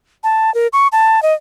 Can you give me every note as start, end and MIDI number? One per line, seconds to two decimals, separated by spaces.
0.24 0.53 81
0.54 0.67 70
0.73 0.88 85
0.92 1.22 81
1.23 1.34 75